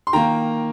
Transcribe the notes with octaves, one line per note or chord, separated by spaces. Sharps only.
C6
D#3 A#3 G5 A#5